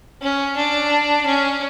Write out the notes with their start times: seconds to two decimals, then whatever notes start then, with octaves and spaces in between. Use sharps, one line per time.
0.22 C#4
0.56 D4
1.26 C#4